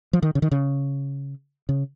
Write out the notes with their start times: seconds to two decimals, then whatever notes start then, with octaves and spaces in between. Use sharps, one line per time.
0.13 F3
0.23 D#3
0.35 C#3
0.42 D#3
0.51 C#3
1.69 C#3